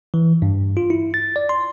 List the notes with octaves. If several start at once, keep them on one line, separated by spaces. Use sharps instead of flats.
E3
G2
F4
E4
A6
D5
C6